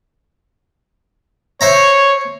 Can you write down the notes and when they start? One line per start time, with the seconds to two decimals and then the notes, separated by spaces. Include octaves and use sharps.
1.61 C5 C#5 E5 A#5